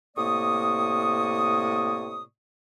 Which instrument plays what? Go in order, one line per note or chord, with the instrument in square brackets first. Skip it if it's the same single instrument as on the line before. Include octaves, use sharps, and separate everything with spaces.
[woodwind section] A2 C3 A#3 D5 C#6 D#6